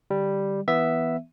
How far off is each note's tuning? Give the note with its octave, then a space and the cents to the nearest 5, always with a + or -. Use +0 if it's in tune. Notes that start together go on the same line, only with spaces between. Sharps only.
D3 +5 G3 +0
E3 +0 B3 +0 E5 +0